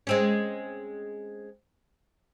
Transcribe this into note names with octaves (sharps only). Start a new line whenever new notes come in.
G#3 C4 C#4